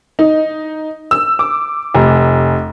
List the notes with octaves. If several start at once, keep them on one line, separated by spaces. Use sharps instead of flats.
D#4
E6
D6
F1